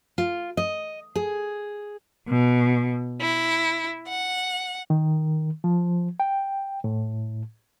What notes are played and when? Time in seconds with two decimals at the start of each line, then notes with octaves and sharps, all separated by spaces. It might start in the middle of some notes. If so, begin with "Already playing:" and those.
0.18 F4
0.57 D#5
1.15 G#4
2.29 B2
3.21 E4
4.08 F#5
4.90 D#3
5.64 F3
6.20 G5
6.84 A2